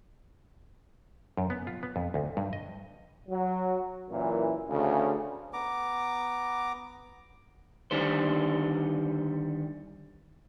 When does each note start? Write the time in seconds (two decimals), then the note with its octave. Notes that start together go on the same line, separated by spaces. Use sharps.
1.37 F#2
1.50 B3
1.67 F4
1.83 B3
1.96 F2
2.14 D2
2.37 G2
2.53 D#5
3.28 F#3
4.10 F#2 A#2 E3
4.68 D2 C#3
5.53 B3 A#5 D6
7.91 D3 D#3 G3 C5